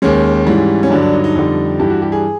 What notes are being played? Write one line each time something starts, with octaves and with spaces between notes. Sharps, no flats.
D#2 D#3 G#3 C#4
G#2 E3 G3
C#4
G2 D3 F#3 D4
D4
D#4
D#4
F2 D3 G3
G2 E3 G3 G4
F#4
G4
G#4